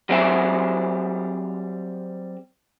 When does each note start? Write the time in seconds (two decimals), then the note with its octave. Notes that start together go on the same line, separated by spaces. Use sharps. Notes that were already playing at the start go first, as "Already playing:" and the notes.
0.09 F#3 G3 C4 G#4 E5